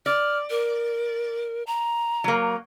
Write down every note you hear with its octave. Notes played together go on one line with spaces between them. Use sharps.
D5 F6
A#4
A#5
F#3 A#3